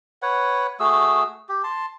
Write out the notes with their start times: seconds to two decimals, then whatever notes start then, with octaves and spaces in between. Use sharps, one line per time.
0.22 B4 C#5 F#5
0.80 A3 F#4 G#4 E6
1.49 G4
1.64 A5 C6